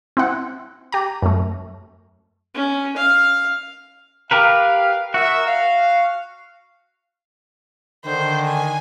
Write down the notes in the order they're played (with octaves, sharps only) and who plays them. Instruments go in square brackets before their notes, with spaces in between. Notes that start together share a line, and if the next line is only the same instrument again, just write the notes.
[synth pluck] C4 E4 F#5
G4 A#5
F#2 A3
[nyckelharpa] C#4
F5
[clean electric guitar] G4 A#4 B4 [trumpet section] F5
[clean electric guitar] F#4 [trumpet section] A#4 E5
[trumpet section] F5
[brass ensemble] D3 D#3 [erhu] C5
[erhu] G#5